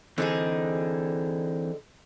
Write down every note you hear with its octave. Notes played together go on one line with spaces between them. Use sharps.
D3 E3 C4 D#4 G#4